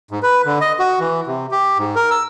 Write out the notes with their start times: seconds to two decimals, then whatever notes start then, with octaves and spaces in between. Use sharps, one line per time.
0.11 G#2
0.23 B4
0.46 D3
0.61 D#5
0.79 F#4
1.00 E3
1.27 C3
1.51 G4
1.78 G#2
1.96 A#4
2.10 E6